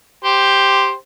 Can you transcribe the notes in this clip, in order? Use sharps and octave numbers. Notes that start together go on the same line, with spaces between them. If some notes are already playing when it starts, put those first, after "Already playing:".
G4 C5